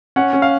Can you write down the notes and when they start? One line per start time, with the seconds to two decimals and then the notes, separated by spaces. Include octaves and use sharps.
0.16 C#4 F#5
0.33 C#4
0.42 F5